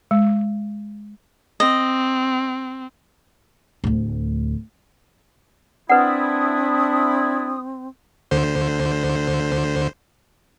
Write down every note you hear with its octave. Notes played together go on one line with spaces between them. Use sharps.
G#3
C4 D#5
D1 D2
C4 D4 E4 B4 F#5 D#6
D2 D3 C5